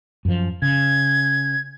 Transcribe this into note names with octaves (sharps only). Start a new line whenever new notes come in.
F#2 F3
C#3 G#6